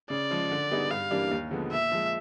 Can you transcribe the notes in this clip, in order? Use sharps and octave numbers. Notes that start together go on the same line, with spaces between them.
C#3 D5
F3 G#3
D3
G3 B3 D#4 G#4
G2 F5
E3 G3 A#3 D4
D#2
D3 F3 G#3 B3
A#2 E5
F3 G#3